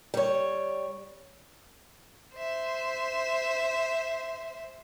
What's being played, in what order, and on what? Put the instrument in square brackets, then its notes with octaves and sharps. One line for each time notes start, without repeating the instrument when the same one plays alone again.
[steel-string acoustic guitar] G3 C#5
[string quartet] C5 E5